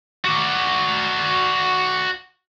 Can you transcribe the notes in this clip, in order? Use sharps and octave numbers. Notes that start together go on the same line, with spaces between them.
F#4 D5